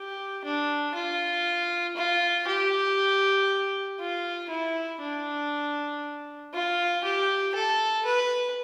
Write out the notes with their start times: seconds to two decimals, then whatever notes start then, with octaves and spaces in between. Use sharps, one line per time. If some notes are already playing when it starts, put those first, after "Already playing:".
Already playing: G4
0.45 D4
0.95 F4
1.97 F4
2.47 G4
4.00 F4
4.50 E4
5.01 D4
6.54 F4
7.03 G4
7.55 A4
8.05 B4